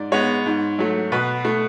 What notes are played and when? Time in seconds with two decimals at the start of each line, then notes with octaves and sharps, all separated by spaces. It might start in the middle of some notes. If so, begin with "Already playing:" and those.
Already playing: G#2 D5
0.12 G#3 B3 C#5
0.46 G#2
0.79 F#3 A3
1.12 B2 B4
1.45 A3